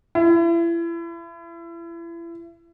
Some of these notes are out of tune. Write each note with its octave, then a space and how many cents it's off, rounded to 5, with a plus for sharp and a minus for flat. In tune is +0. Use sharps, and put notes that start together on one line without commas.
E4 +35